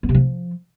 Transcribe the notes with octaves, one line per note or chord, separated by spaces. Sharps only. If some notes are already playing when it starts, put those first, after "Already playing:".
B3
C3
F3